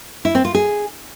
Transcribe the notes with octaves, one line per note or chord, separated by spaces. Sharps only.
E4
C4
F4
G#4